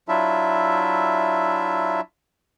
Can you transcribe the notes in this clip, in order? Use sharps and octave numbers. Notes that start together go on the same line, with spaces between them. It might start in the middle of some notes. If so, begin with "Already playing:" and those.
F#3 D4 E4 F4 E5